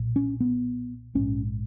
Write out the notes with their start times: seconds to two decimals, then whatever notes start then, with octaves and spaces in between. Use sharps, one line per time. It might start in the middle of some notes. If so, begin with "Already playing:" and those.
Already playing: B1 A#2
0.16 C#4
0.40 B3
1.15 A#1 G#2 C#4